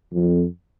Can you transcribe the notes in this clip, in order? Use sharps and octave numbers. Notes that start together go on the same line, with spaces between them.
F2